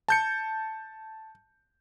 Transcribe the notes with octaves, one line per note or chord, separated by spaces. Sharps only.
A5 G6 C#7